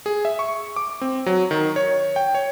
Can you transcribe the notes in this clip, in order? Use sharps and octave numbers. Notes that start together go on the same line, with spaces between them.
G#4
E5
C#6
D6
C4
F#3
D#3
C#5
G5
C#5